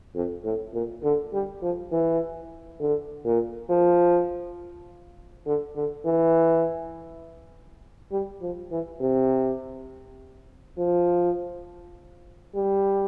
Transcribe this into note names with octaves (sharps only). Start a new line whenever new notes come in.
F2
A2
A#2
D3
G3
F3
E3
D3
A#2
F3
D3
D3
E3
G3
F3
E3
C3
F3
G3